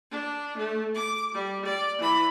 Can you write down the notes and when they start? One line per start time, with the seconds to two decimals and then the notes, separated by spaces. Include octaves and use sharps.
0.11 D4
0.57 A3
0.95 D6
1.34 G3
1.65 D5
1.99 E3 B5